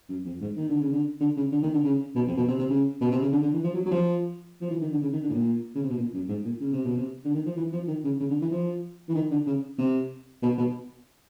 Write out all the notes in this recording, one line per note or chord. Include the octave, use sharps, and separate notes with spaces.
F#2
F2
G#2
D#3
D3
C#3
D3
D3
C#3
D3
D#3
D3
C#3
B2
F2
B2
C3
C3
C#3
B2
C3
C#3
D3
D3
E3
F3
F#3
F#3
F3
F3
E3
D#3
D3
C#3
D#3
D3
A2
A#2
C#3
C3
B2
A#2
F#2
G#2
A#2
C#3
C3
B2
C3
D3
D#3
F3
E3
F3
D#3
C#3
C#3
D3
E3
F3
E3
D#3
D3
C#3
C3
B2
B2